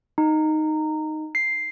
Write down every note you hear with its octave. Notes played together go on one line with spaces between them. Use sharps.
D#4
C7